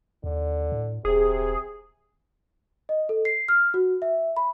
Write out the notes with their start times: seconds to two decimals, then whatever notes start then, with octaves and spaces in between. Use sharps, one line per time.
0.24 D#2 D3
0.72 A2
1.05 D#1 C3 G#4
2.89 D#5
3.09 A4
3.25 C7
3.49 F6
3.74 F#4
4.02 E5
4.37 B5